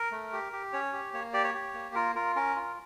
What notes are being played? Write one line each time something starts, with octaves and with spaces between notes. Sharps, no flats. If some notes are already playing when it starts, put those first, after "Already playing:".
Already playing: A#4
A3
G4
G4
C#4 C#5
G4
A#3 C#5
G4 D5
C#5
G4
A#3
F4 A#4
F4 A#4
C#4 A#4
F4